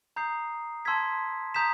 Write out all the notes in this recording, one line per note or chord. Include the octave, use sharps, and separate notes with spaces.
A#5 D#6 G6 C7
A5 C6 E6 G#6 B6
A#5 D#6 G6 B6 E7